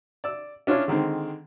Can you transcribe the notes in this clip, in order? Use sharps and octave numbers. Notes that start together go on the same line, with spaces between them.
D5 E6
C#4 D4 E4 F4 C#5
D3 D#3 G#3 C4